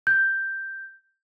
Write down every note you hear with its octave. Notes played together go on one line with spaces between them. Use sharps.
G6